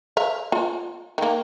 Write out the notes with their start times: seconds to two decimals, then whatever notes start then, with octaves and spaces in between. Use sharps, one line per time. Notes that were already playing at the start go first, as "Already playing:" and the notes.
0.17 E5 F5
0.52 F4
1.18 D#3 A#3